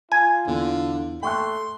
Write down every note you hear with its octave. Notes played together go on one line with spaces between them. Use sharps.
F4 G#5
E2 D3
A3 G5 C6 C#6 F#6